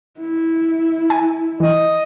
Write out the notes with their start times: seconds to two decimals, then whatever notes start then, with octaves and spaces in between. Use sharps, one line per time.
0.19 E4
1.10 G#5
1.60 E3 D#5